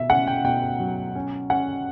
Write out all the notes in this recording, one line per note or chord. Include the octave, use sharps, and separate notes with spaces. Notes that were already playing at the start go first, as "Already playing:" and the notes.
Already playing: B2 E5
C#4 F#5
G5
B2 G5
F#3
C#4
C#4 F#5